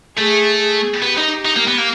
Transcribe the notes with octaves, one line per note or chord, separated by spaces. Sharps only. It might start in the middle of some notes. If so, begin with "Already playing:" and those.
A3 G#4
G#4
B3 G4
D#4
D#4
A#3
B3
A#3